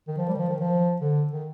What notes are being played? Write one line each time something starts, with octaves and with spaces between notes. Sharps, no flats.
D#3
F3
G3
D#3
F3
D#3
F3
D3
D#3